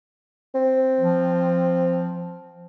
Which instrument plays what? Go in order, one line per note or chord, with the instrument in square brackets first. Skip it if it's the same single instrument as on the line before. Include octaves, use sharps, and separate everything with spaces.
[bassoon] C4
[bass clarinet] F3